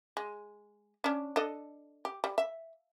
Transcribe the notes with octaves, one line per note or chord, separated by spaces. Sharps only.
G#3
C#4 D4
D4 A4 D#5
G4
G3
E5